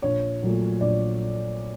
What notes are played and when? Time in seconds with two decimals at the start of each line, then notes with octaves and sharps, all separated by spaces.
0.02 A#1 C#5
0.43 A#2 F#3 A3
0.81 A#1 D5